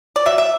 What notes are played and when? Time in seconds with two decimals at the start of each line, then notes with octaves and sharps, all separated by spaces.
0.16 D5
0.26 F#3 E5
0.38 E5